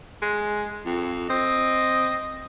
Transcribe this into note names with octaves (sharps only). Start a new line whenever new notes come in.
G#3
F2
C4 D#5